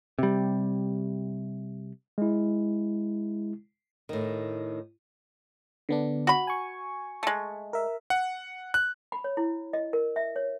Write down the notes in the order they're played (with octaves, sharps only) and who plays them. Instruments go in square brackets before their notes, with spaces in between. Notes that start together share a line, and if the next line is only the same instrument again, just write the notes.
[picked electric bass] C3 G3
[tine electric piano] G#3 E4
[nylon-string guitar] A2 D#3
[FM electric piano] D3 B3 D4
[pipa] F#4 B5
[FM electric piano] G#5 C#6
[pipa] G#3 A3
[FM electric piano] A#4 E5
[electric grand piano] F#5
F#6
[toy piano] B5
C#5
E4
D#5
A#4
E5
C#5